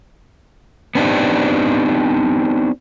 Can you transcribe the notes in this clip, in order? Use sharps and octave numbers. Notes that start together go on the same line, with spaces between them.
B3 C4 D4 D#4 G4